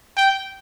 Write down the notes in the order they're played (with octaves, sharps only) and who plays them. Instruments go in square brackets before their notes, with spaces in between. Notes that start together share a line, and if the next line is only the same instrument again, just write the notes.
[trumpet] G5